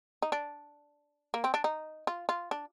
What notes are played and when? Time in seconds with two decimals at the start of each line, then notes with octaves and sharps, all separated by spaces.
0.22 D#4
0.32 D4
1.34 A#3
1.44 C4
1.54 D4
1.64 D#4
2.07 F4
2.29 F4
2.51 D4